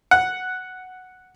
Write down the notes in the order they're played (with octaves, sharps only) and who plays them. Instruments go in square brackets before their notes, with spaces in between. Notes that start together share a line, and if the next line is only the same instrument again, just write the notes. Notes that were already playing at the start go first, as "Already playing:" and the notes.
[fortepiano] F#5